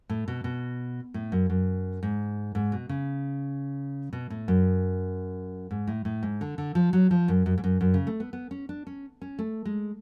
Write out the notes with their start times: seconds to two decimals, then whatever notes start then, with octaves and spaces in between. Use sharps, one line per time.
0.09 A2
0.28 B2
0.44 B2
1.14 A2
1.32 F#2
1.50 F#2
2.03 G#2
2.55 G#2
2.72 B2
2.89 C#3
4.13 B2
4.30 A2
4.48 F#2
5.71 G#2
5.87 A2
6.05 A2
6.23 G#2
6.41 D3
6.58 D3
6.75 F3
6.93 F#3
7.11 F3
7.28 F#2
7.46 F#2
7.58 G#2
7.64 F#2
7.81 F#2
7.94 C#3
8.07 A3
8.20 B3
8.33 B3
8.51 C#4
8.69 D4
8.87 C#4
9.22 C#4
9.39 A3
9.65 G#3